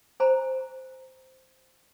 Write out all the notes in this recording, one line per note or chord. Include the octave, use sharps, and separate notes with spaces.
C5 G#5 A#5 B5